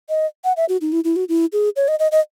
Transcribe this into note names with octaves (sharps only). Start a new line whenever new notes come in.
D#5
F#5
E5
F#4
D#4
E4
E4
F#4
E4
G#4
C#5
D#5
D#5
D#5